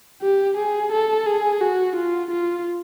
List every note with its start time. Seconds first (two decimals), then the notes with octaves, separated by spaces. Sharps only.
0.22 G4
0.57 G#4
0.93 A4
1.26 G#4
1.61 F#4
1.96 F4
2.31 F4